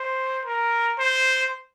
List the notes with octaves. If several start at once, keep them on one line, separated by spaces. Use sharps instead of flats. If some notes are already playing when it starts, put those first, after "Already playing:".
Already playing: C5
A#4
C5